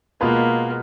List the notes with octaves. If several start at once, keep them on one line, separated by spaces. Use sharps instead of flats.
B2 G#3 A#3 B3 F4 B4